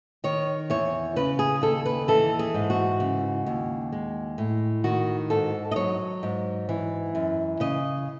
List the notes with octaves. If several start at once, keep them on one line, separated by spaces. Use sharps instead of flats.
D#3 C#5
E2 C#5
C#3 B4
G#4
D#2 A4
B4
E3 A4
G#4
G#2
F#4
C#3
D#2
G#3
A2
D#3 F#4
G#2 A4
D#5
F#3 C#5
G#2
E3
F#2
C#3 D#5